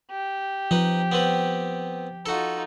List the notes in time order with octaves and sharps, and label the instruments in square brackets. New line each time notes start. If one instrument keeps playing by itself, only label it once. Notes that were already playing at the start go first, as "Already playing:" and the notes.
[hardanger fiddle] G4
[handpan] F3 [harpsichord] D#4 B4
[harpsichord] B3 C4 B4
[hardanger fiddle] D#4 F4 [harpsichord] F#4 A4